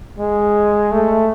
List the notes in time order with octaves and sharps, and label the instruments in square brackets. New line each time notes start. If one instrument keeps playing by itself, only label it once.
[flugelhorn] G#3
A3